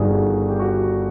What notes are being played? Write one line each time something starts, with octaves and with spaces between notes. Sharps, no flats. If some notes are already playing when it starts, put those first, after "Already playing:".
Already playing: G1 G2 D#3 F#4 G#4
G4
F#4